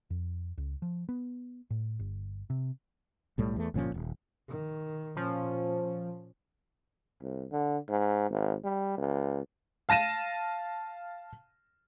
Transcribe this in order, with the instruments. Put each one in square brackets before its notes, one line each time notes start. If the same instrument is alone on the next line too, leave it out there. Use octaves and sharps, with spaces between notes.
[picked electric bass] F2
C#2
F3
B3
A2
G1
C3
[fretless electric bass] B1 A2 G3 A3
E2 A3
G1 A#2 F3 C#4
D#1 B1
[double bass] D#3
[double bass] A#2 C#4 [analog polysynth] F3
[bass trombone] C2
D3
G#2
G#1
G3
C#2
[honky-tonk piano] F5 A5 A#6 D#7 E7